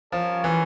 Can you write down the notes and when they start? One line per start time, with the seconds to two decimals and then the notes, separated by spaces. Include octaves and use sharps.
0.12 F3 G3 C#4 F4 A#4 C#5
0.44 E3